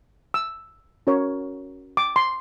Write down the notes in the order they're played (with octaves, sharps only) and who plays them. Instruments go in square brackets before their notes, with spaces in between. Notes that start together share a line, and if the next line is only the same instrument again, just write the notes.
[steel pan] E6
C#4 F#4 A#4 C#5
D6
C6